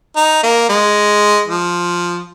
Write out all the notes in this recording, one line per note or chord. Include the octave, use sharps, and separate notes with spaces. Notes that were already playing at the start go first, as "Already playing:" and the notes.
D#4
A#3
G#3
F3